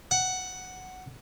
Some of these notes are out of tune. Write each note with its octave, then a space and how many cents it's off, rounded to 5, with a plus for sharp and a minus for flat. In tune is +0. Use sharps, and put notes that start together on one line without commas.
F#5 +5